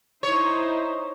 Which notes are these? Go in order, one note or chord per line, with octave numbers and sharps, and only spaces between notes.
D#4 E4 C5 C#5